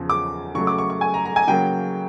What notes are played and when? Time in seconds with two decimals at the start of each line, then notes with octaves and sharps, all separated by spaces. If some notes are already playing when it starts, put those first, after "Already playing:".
Already playing: E2 C#3 F3
0.10 D6
0.55 C#3 F#3 A3 C#6
0.67 D6
0.78 C#6
0.90 C#6
1.01 G#5
1.14 A#5
1.25 A#5
1.36 G#5
1.48 C#3 F#3 A#3 G5